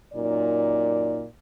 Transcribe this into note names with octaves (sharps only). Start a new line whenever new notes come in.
F#2 A#2 D#4 D5